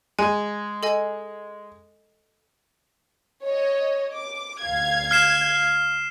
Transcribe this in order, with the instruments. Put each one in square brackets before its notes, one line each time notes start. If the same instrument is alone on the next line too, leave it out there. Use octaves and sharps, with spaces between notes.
[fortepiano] G#3 [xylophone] G#5
[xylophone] A4 D#5 G#5
[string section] C#5 D#5
D6
D2 F5 G#6
[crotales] F6 C7 E7